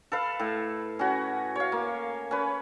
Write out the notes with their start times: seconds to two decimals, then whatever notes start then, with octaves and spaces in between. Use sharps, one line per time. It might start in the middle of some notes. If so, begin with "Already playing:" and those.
0.12 A4 B4 F5
0.39 A2
0.99 C#4 F#4
1.55 C#5 F5
1.72 A#3
2.31 C#4 B4